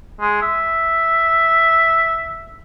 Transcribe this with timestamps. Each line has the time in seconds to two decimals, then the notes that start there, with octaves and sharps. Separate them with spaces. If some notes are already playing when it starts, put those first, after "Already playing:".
0.21 G#3
0.42 E5